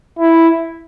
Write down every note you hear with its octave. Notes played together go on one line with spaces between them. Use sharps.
E4